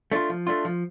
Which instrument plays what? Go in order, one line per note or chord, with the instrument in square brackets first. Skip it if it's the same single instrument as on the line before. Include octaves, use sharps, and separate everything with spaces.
[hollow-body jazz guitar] A3 D4 F4
F3
A3 D4 F4
F3